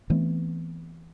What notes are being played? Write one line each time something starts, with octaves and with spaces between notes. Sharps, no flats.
E3 A3 B3 C4